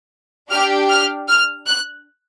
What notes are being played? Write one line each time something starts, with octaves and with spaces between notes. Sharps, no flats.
D4 G4 F6
F6
F6
F#6